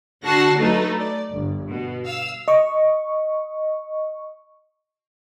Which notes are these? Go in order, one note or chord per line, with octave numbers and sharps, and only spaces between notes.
D3 F#4 A5 A#6 C7
F#3 A3 D#4 B4
D5
G1
B2
F5 E6
D#5 C#6